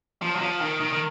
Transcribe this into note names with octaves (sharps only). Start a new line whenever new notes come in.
F3
F#3
F3
D#3
D#3
D#3